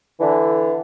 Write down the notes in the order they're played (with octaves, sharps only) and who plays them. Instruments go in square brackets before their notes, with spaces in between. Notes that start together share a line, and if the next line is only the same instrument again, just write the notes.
[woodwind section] D3 E3